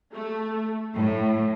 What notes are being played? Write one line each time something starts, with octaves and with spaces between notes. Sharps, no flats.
A3
A2